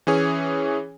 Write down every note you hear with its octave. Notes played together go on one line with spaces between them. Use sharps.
E3 C#4 G#4 C#5